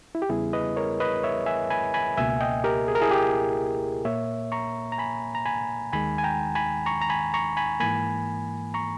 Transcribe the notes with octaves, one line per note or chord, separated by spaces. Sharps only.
E4
G4
E2 C#3 G3 B3 E4 G#4
B4 D#5
A#4 C#5
B4 D#5
C#5 E5
E5 G#5
G#5 B5
G#5 B5
C#2 B2 A#3 E5 G#5
D#5 G5
G4 A#4
G#4
A#4
E4 G#4
G4
A#2 A#3 C#5 E5
A#5 C#6
A#5
G#5 B5
A#5
G#5 B5
D#2 D#3 G#3 G#5 B5
G#5
G5 A#5
G#5 B5
A#5 C#6
A#5
G#5 B5
A#5 C#6
G#5 B5
G#2 E3 A#3 G#5 B5
A#5 C#6